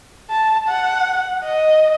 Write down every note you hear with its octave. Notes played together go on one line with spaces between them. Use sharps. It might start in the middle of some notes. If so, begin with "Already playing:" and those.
A5
F#5
D#5